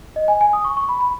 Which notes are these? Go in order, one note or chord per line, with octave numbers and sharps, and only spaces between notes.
D#5
G#5
G#5
D#6
C#6
C#6
B5
B5